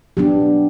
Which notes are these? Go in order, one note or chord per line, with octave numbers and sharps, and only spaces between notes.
F#3 B3 D4 G4